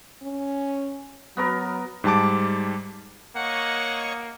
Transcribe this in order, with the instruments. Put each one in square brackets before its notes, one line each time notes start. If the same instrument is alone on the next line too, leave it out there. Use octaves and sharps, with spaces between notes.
[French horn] C#4
[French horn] F#3 [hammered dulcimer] B3 F#4 A#4
[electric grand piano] G#2 G3 A5 D6
[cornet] A#3 [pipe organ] C#5 D#5 C#6 [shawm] F#5